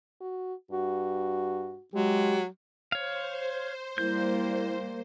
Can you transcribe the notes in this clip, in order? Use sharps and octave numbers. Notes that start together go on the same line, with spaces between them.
F#4
G2 F#4
F#3 G#3 G4
C5 C#5 F5
G3 A#3 E4 G6